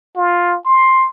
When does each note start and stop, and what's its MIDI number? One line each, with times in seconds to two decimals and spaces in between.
0.16 0.57 65
0.65 1.08 84